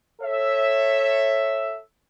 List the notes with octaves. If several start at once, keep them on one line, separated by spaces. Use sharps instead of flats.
A4 C#5 E5